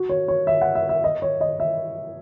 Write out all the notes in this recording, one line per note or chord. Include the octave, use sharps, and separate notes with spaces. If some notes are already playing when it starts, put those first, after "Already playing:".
Already playing: F#4
C#5
C#5
E5
F#5
E5
E5
D#5
C#5
D#5
E5